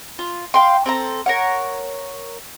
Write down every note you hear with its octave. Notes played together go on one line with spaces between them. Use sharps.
F4
F5 G5 C6
C4 A4 A#5
A#4 C#5 F#5